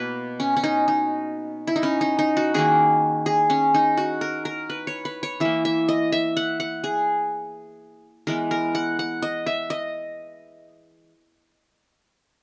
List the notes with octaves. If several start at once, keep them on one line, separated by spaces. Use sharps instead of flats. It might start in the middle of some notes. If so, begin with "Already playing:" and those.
Already playing: B2 A#3 B4
C#4
C#4
D#4
D#4
E4
D#4
C#4
D#4
D#4
F#4
D#3 A#3 G#4
G#4
C#4
D#4
F#4
A#4
A#4
B4
C#5
B4
C#5
E3 A#3 E5
E5
D#5
E5
F#5
F#5
G#4
E3 G#3 B3 A#4
A#4
F#5
F#5
D#5
E5
D#5